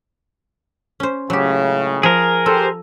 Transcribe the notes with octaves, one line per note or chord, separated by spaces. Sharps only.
C#4 C5
C#2 A2 C#3 F#3 G4
F3 G#4 A#4
G4 A4 C5